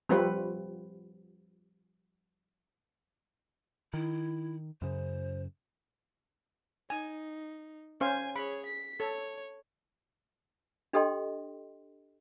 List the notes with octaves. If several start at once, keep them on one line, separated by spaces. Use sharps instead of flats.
F3 G3 C4 F4 F#4 B4
D#3 E4
F#2 C#3 C5
D#4 G#5
C#4 C5 F5 G#5
G#4 C#5 B5
B6
A4 C#5
D4 G4 A4 D#5 G5 C6